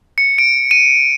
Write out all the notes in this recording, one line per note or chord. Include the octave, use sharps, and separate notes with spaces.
C#7
D7
D#7